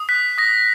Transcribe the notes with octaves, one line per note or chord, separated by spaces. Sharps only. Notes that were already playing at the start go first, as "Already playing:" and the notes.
Already playing: D#6
F#6 B6
D#6 A#6